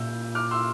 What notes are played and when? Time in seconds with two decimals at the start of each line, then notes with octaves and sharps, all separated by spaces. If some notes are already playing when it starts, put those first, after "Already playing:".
Already playing: A#2 E6 G6
0.35 D6 F6
0.51 C6 E6